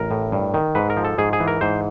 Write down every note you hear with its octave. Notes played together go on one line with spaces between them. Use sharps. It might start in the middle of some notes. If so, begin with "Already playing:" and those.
Already playing: A1 A#4
A2
G2
D#3
G#2 B4
A#4
F3
A4
G#2 G#4
G#4
E3
A#4
G#2 C5